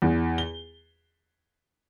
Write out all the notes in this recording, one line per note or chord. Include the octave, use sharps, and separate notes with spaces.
E2
G7